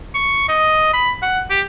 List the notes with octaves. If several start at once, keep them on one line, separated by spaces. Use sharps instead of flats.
C#6
D#5
B5
F#5
G4